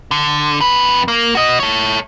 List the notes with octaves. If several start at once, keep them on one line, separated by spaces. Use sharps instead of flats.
D3
F2 B4
A#3
F#4 D#5
A4 C#5